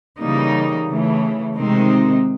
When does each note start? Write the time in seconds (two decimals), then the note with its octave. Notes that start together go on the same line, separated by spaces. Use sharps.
0.19 C#3 E3 G3 A#3 D#4
0.87 C#3 E3 A3
1.56 C3 D#3 G#3 C4 D#4